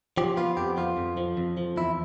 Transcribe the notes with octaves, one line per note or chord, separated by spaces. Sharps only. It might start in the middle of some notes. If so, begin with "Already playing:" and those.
F3 G4
B3 F4
F2 G4
F3 F4
F2
F3
F2
F3
E2 E4